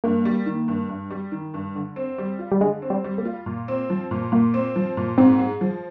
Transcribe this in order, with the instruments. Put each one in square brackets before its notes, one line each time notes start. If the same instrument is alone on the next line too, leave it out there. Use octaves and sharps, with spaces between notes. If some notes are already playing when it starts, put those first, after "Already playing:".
[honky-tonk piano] G2 [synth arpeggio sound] A#3
[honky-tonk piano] G3
D#3
G2
G2
G3
D#3
G2
D3
C4
G3
F4
[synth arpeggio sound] G3
[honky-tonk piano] D3 [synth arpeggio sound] G#3
[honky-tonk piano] C4
[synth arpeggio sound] G3
[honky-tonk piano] G3
[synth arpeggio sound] A#3
[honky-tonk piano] F4
A#2
C4
F3
A#2
[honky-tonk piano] A#2 [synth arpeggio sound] A#3
[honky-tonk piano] C4
F3
A#2
[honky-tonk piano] G#2 [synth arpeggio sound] C4
[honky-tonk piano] G#3
F3